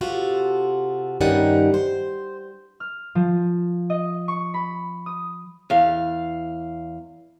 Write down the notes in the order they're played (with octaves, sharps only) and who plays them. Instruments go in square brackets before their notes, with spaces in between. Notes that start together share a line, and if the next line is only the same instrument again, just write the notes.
[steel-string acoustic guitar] C3 F4 F#4 A4
G2 D#3 G3 C#4 D#4 F#5
C5
[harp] F6
F3
D#5
C#6
B5
D#6
[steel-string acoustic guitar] E2 F5